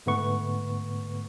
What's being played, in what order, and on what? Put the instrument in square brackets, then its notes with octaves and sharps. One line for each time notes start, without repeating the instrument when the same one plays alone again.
[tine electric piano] G#2 D3 A3 B3 B4 C#6